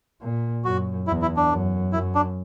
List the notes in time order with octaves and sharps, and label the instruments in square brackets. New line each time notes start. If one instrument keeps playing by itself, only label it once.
[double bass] A#2
[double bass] F#2 [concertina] F#4
[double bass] E2 [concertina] E4
[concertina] E4
D4
[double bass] F#2
[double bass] F#2 [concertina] E4
[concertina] D4